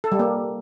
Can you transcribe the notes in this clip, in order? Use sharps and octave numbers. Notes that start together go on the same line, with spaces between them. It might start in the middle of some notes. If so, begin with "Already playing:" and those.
A4
G3
A#3